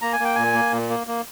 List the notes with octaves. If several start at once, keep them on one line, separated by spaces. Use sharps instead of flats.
A#3 A#5
G#5
A#3 G5
A#2 G#5
A#3
A#2
A#3
A#3